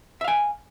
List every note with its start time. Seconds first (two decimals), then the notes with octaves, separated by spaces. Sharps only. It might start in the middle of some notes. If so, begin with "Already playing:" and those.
0.21 E5
0.24 F5
0.28 G#5